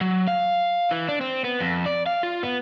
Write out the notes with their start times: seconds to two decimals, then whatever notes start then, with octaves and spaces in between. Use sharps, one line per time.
0.01 F#3
0.28 F5
0.91 E3
1.09 D4
1.21 C4
1.44 B3
1.60 F2
1.86 D5
2.06 F5
2.23 F4
2.43 B3